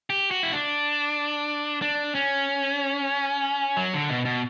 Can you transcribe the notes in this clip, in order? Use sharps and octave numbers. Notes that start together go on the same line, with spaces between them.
G4
F#4
E4
D4
D4
C#4
F#3
D3
B2
B2